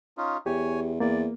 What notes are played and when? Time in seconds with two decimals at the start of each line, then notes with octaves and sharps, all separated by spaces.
0.17 C#4 D#4 F4
0.46 E2 G4 C#5 G#5
1.00 E2 A#3 D5